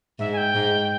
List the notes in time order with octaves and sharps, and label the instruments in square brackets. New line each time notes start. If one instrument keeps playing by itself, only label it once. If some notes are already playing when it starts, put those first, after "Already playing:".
[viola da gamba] G#2 [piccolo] E5
[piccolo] G#5
G5
[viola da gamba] G#2